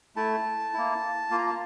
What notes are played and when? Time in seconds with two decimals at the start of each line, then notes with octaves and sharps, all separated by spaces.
0.16 A3 E4 A5
0.74 A#3 E4
1.30 A#3 F4
1.38 A#5
1.46 A5